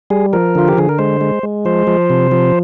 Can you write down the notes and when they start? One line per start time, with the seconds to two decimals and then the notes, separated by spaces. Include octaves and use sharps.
0.10 G3 G#4
0.33 F3 A#4
0.55 D3 F4
0.68 G4
0.78 D3 G#4
0.89 A#4
0.99 G#3 C5
1.21 G#3
1.43 G#3
1.65 F3 C5
1.87 F3
2.10 C3
2.32 F3